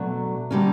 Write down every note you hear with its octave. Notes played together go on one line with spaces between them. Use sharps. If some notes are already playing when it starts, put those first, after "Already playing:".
Already playing: B2 F#3 A3 D4
D3 G3 A#3 C#4